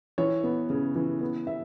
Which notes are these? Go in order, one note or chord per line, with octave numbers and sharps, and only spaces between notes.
E3 C#5
B3
C#3
E3
B3
B3 E5